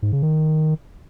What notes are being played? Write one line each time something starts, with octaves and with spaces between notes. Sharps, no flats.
G#2
C#3
D#3